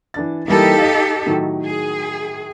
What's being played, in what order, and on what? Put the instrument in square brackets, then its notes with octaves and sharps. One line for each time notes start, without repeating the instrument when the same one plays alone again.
[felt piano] E3 D4 A6
[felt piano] E3 G3 A#3 [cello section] D#4 G4 A4
[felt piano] D#5 F5
A2 D#3 F#3
[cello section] G#4